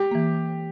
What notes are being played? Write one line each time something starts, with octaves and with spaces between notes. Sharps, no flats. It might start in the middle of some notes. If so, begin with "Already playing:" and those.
Already playing: G4
E3 A#3